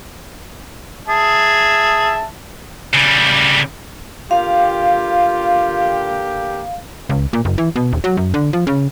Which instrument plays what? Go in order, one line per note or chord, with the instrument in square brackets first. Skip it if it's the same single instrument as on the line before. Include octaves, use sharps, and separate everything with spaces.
[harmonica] G#4 E5 A5
[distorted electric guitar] C#3 G3
[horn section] D3 A#3 G4 [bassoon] F4 [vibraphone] F5
[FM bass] C#2
A#2
F#1
E3
B2
D#1
F#3
F#2
D3
F3
C#3